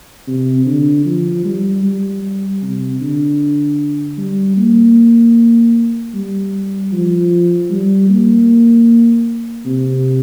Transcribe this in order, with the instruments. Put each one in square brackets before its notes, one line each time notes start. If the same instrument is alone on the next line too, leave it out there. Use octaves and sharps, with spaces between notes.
[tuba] C3
D3
F3
G3
G3
C3
D3
G3
A#3
G3
F3
G3
A#3
C3